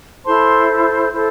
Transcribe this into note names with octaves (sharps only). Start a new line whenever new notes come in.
E4 A4 C5 A5 C6
E4 A4 C5